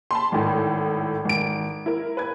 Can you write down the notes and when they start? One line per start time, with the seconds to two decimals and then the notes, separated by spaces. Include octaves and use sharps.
0.11 A5 B5 C6
0.32 G#1 A2
1.25 G#1 D7
1.86 E4 A#4
2.17 B4 G#6